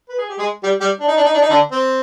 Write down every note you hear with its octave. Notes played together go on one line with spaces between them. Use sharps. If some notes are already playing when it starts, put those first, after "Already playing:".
B4
G#4
G4
G#3 G#4
G3 G4
G3 G4
D4
D#4
D4
D#4
D4
D#4
D3 D4
C4